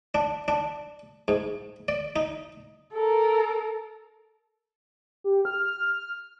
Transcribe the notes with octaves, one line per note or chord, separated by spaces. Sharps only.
D4
D4
G#2
D5
D#4
A4 A#4
G4
F6